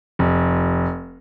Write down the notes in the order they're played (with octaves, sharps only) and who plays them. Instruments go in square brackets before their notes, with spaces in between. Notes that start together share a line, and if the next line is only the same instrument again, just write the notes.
[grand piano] F1